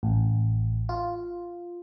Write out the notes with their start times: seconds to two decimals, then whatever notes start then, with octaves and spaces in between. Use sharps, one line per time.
0.03 A1
0.89 F4